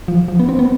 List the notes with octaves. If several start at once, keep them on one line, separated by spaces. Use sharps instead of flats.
F3
F3
B3
C4
B3